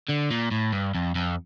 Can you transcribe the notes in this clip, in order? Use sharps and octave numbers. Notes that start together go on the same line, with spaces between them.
D3
A#2
A2
G2
F2
F2